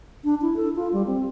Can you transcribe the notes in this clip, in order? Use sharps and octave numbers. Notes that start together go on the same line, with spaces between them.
D4
E4
A4
F4
G3
C4